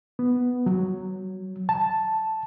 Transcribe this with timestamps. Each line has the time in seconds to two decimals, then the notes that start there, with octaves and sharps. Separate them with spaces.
0.19 B3
0.66 F#3
1.69 A5